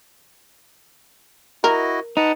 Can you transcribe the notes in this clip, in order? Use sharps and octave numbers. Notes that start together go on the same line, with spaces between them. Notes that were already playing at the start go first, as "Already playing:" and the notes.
E4 F#4 A#4 D#5
D#4 B4 F#5 A5